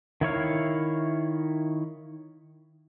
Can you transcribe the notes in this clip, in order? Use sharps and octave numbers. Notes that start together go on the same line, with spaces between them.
D#3 E4 C#5 F5